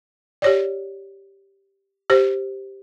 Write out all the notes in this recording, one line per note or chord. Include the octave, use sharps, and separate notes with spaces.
G4 C#5 D5
G4 C5